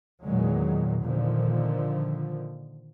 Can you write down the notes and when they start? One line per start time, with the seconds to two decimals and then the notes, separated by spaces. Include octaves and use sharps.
0.23 E2 A#2 D#3 F#3 G#3
1.02 A#2 D3 D#3 F3